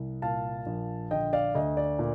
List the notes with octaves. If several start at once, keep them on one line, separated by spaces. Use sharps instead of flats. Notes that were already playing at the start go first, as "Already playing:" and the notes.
Already playing: C2
A#2 F5 A5
A#1
D3 D#5 G5
D5 F5
D2 D#5
D5
A#2